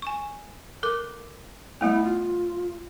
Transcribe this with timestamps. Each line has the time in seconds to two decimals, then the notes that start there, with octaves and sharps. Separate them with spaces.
0.02 G#5 C#6
0.83 A4 A#4 D6
1.81 G3 A3 B3 E4
2.04 F4